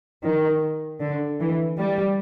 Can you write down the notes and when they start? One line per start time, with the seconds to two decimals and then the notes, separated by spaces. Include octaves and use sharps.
0.23 D#3
1.01 D3
1.40 E3
1.79 G3